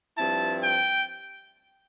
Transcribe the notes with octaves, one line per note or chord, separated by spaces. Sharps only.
G2 F3 C4 E4 A5
G5